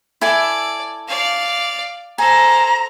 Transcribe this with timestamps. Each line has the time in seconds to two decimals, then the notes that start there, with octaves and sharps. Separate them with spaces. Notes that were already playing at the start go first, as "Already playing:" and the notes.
0.21 E4 A4 D5 G#5
1.08 D5 F5
2.18 A4 C5 G#5 A#5